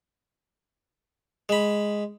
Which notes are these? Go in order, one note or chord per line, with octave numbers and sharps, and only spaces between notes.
G#3 B5